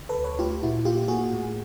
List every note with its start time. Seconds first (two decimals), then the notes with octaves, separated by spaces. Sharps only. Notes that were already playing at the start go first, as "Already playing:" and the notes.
Already playing: D3
0.09 A4 B4
0.16 D2
0.24 B4 C#5
0.39 A3 F4 G4
0.63 A#2 E4 F#4
0.85 A#3 F4 G4
1.08 A#3 F#4 G#4
1.32 A2